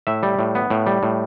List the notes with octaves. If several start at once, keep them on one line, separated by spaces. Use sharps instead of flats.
A2 E5
G3
A2
B3
A2
G3
A2